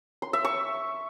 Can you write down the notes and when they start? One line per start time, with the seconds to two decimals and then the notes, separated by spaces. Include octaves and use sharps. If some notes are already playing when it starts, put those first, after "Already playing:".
0.22 C6
0.33 E5
0.44 C#6